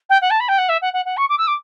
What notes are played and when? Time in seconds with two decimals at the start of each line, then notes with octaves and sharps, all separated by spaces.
0.10 G5
0.22 F#5
0.31 A5
0.40 B5
0.49 G5
0.58 F#5
0.69 E5
0.82 F#5
0.93 F#5
1.06 F#5
1.17 C#6
1.29 D6
1.38 E6
1.47 D6